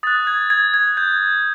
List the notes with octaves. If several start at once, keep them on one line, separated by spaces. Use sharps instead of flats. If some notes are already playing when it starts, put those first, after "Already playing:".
D#6 F#6 A6
G#6
G#6
G#6
G6